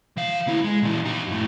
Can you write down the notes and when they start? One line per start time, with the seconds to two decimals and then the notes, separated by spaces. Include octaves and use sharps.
0.17 E3 F5
0.47 D2 E4
0.64 G#3
0.82 A#2 E3
1.05 D#4 G4
1.27 F#2 A2